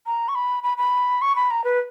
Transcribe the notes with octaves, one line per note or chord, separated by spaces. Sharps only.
A#5
C#6
B5
B5
B5
C#6
B5
A#5
B4